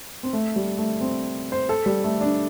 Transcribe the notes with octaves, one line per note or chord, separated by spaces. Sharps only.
C4
A3
G3
A3
C4
C5
A4
G3
A3
D4